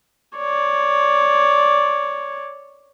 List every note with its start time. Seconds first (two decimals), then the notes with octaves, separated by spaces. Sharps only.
0.37 C#5 D5